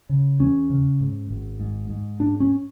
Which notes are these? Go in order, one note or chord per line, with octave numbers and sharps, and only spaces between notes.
C#3
E2 C#4
C#3
G#2
G#1
G#2
G#2
G#2 D4
C#4